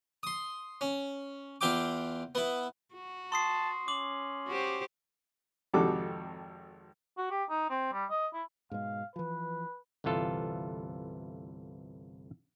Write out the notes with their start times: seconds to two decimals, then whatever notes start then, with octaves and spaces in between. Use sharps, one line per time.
0.23 C6 D#6
0.81 C#4
1.61 E2 F4 E5 G5 D6
2.35 B3 E4
2.95 F#4
3.32 A5 C6 D#6 C7
3.88 C#4 D6 F#7
4.48 F#4 G4 C5
5.74 G#1 F2 C3 F#4 A4 D6
7.18 F#4
7.31 G4
7.50 D#4
7.70 C4
7.93 G3
8.10 D#5
8.34 E4
8.71 G#2 B2 G#3 F5
9.16 E3 F3 B4
10.04 G1 C2 E3 F4 A4